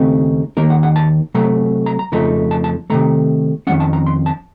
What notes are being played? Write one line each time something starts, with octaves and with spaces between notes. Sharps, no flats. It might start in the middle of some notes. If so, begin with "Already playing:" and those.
Already playing: D#2 C#3 A3 C4 D#4
D#2 D#3 A#3 D#4 A#4
F#5
F#5
A5
C3 F#3 A3 A#5
A#5
A#5
F2 C#3 F3 A3 D#4 A#5
A5
A5
C3 D#3 A3 A#5
F2 D#3 F#3 A3 C#4 F#5
A5
A#5
C6
A5